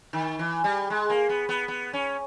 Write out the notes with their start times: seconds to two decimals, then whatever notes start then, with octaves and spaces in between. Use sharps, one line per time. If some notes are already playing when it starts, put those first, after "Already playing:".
0.13 D#3
0.39 E3
0.64 G3
0.90 G#3
1.10 A#3
1.29 B3
1.49 B3
1.68 B3
1.93 C#4